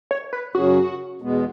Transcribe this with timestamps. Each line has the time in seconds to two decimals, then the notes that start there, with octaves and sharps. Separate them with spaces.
0.11 C#5
0.33 B4
0.55 F#2 C#3 F#3 C#4 F#4 G#4
1.21 E2 B2 G#3 B3